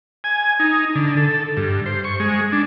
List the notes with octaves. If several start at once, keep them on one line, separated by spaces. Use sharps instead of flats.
G#5
D#4
D3
A4
G2
C5
C#6
G#3
D4